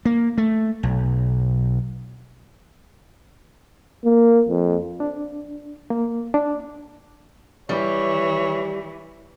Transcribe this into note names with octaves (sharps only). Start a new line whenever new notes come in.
A#3
A3
B1
A#3
F2
D4
A#3
D4
E3 G3 C#5